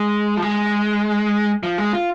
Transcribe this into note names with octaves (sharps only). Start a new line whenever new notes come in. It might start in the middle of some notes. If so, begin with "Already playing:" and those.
Already playing: G#3
F3
G#3
F3
G#3
F4